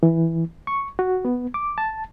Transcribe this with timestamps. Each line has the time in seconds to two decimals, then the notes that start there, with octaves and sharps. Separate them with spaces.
0.03 E3
0.67 C#6
0.99 F#4
1.25 B3
1.54 D6
1.78 A5